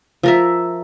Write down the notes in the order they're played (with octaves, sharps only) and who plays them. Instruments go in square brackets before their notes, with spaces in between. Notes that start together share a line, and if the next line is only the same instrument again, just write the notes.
[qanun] F3 A#4 E5